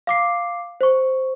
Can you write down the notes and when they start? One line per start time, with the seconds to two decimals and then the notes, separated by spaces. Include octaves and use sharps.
0.07 F5 D6 C7
0.81 C5 C#6